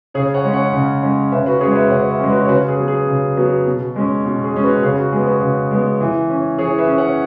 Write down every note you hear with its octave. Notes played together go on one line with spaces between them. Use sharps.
C#3 G#4 C#5
C#5 F#5
G#3 C#4
C#5 F#5
C#3
G#3 C#4
C#3 B4 E5
F#4 B4
G#3 C#4 G#4 C#5
B4 E5
C#3 C#5 F#5
B4 E5
G#3 C#4
F#4 B4
C#5
C#3 F#4 B4
G#4
F#3 B3
G#4
C#3
F#3 B3
B2
G#3 C#4
B2 F#4
G#4
G#3 C#4
F#4 B4
C#3 G#4
F#4
G#3 B3 G#4
F#4 B4
C#3
G#3 B3
E3
C#4
E3 G#4 C#5
B4 E5
C#4
C#5 F#5